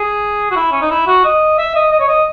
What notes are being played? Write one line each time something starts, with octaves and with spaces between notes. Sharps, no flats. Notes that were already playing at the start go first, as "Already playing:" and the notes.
Already playing: G#4
F#4
E4
C#4
D#4
E4
F#4
D#5
E5
D#5
D#5
C#5
D#5